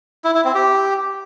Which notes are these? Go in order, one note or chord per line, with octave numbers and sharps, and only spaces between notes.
E4
E4
C4
G4